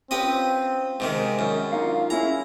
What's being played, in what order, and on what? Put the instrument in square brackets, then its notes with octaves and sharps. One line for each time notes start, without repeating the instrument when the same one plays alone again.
[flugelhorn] C4 [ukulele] C#4 F4 G4 [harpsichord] B4 D#5
[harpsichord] G#2 C3 D#3 [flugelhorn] G#3
[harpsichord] F#2
[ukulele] D4 D#4 F5 [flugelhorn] F4
[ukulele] C#4 G#4 [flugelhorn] E4 [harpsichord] A#5